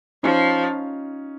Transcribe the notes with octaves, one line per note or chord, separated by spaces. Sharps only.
F3 C#4 D#4